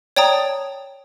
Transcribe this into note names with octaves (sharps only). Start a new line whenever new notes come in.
C#5 D5 G5 A5 A#5 D#6